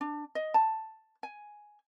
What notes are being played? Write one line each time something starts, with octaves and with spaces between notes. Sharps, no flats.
D4
D#5
A5
G#5